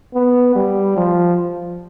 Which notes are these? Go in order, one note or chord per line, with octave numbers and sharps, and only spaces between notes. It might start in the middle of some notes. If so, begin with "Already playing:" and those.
B3
G3
F3